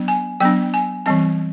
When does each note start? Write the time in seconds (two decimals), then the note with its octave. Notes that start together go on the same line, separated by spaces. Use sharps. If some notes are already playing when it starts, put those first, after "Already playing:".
Already playing: F#3 B3 D4
0.08 G#5
0.40 F#3 B3 D4 G5
0.74 G#5
1.06 E3 G3 C4 A5